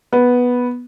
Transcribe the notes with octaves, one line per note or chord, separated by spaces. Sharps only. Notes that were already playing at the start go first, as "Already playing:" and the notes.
B3